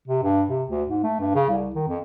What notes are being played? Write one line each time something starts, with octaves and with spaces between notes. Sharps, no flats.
C3
G2
C3
D2
G#2
A3
G2
C#3
C2
D#3
F2